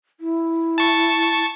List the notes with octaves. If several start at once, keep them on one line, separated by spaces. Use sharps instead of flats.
E4
A5 C#6